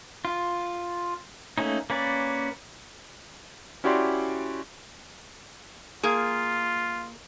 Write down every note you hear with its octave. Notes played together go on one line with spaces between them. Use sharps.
F4
A3 A#3 C#4 D#4
A#3 C#4 B4 D5
C#4 E4 F#4 G4 D5 C6
A#3 F4 G#4